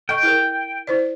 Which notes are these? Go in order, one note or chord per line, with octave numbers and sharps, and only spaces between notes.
A4 D#5 G5 C#6
E4 G#4 A#4
E4 C5 D5